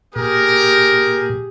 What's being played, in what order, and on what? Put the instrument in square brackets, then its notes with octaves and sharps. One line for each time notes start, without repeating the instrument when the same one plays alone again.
[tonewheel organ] A#2 [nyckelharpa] G4 G#4 [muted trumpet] A#4